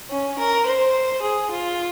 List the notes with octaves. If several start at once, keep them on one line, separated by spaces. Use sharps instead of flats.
C#4
A#4
C5
G#4
F4